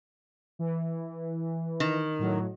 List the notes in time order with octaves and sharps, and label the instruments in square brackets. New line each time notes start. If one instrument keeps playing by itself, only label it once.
[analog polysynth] E3
[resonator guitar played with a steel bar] D#3
[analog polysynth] A2 F#3